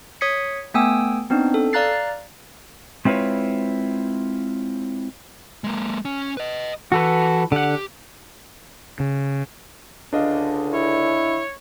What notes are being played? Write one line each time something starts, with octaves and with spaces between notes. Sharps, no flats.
C#5 D#6 G#6 B6 C#7
A3 B3 G5 G#5 D#6 E6
B3 C4 D4 D#4
A4
D5 F5 A#5 F#6 A6 C7
G#3 C4 E4 F4 B4 C#5
G#3 A#3
C#4
B4 D#5
E3 F#4 A4 B4
D3 G4 F#5
C#3
C#2 D3 D4 D#5 F5
E4 C#5